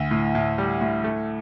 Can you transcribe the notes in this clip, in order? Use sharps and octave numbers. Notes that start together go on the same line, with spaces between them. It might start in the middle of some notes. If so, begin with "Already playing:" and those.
Already playing: D2
A2
A2
G3
A2
A3